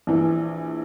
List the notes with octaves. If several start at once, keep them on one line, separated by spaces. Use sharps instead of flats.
A#1 E3